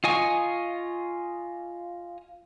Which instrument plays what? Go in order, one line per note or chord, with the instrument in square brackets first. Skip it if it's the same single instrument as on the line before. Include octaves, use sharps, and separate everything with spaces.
[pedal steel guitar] F4 D#5 G#5 C#6